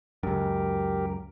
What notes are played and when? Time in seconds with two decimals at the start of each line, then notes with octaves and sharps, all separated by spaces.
0.23 C#2 F#2 G4 A#4